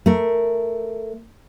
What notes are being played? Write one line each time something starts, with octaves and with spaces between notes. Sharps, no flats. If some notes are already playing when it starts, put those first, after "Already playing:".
A3 A#4